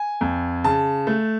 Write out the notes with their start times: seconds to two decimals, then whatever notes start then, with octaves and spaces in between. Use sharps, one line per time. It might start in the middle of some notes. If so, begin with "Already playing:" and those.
Already playing: G#5
0.21 F2
0.64 C#3 A5
1.07 A3